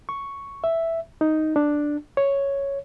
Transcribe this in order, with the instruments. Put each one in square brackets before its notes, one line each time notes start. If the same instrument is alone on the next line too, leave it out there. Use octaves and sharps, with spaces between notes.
[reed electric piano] C#6
E5
D#4
D4
C#5